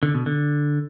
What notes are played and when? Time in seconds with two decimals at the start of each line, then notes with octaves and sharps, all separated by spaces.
0.03 D3
0.14 B2
0.26 D3